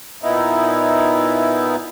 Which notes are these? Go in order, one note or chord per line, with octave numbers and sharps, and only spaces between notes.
A#2 B3 D#4 E4